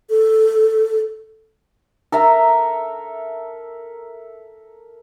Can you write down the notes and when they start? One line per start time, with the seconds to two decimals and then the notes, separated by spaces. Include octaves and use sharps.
0.10 A4
2.12 A4 A#4 E5 A#5